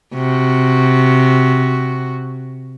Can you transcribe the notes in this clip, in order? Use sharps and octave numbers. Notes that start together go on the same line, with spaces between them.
C3 F#4